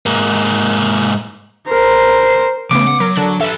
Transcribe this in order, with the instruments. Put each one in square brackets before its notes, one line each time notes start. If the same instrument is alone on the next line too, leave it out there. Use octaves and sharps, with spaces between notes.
[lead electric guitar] G#2 A#3
[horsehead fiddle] A#4 C5
[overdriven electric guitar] E2 A3 [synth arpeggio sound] C#3 B3 [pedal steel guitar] D6
[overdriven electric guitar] F#5
[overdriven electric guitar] F#3 [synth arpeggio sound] A#4
[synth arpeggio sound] D3 A5 F#6
[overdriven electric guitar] A4 B4 [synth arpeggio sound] E5 E6 F#6